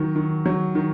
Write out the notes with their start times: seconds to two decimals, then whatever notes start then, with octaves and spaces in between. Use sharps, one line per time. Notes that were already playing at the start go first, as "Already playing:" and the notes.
Already playing: D#3 F#3
0.16 D#3
0.46 F#3
0.75 D#3